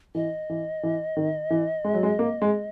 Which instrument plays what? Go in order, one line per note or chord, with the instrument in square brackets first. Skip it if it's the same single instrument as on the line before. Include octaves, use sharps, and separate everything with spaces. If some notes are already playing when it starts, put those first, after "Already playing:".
[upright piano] E3 [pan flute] D#5
[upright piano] E3
E3
D#3
E3
G#3
F#3
G#3
A#3
G#3